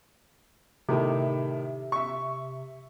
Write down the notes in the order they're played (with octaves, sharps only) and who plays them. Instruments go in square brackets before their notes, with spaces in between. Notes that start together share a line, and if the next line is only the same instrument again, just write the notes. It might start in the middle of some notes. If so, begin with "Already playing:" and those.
[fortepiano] A2 D#3 A3 [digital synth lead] C3
[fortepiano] E5 C#6